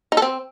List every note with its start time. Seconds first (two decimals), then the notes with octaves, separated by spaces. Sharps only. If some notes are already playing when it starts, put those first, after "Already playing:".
0.12 D#4
0.17 A4
0.22 C4